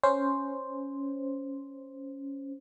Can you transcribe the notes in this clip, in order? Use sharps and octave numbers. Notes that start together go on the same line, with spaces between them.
C#4 C5